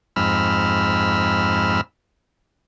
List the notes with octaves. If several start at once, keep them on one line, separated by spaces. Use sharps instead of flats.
F2 G#2 B5 E6 F6